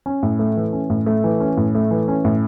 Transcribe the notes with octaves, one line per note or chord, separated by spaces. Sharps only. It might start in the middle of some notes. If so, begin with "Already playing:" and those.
C#4
A2
A3
E3
C#4
A2
A3
E3
C#4
A2
A3
E3
C#4
A2